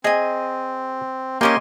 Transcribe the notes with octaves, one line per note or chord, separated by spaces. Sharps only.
C4 G#4 D#5 G#5
A#3 C#4 G4 A#4 D#5 G#5 C6 D6